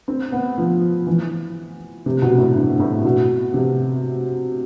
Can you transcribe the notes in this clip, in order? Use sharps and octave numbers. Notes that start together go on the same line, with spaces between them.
C4
B3
F3
E3
C3
B2
A2
G2
A2
B2
C3